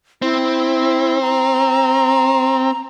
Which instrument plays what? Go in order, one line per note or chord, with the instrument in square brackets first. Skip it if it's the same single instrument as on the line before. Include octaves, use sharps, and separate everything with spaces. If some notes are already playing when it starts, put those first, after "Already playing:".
[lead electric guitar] C4 [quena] E4
[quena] A#5